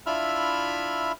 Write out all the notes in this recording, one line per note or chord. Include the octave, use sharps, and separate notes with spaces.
D4 E4 F4 E5 B5 F6